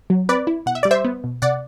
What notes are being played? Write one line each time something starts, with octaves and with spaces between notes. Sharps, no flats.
F#3
C4 B4 D5
E4
B2 F#5
E5
G3 D5
C5 E5
B3
B2
C3 D5 F#5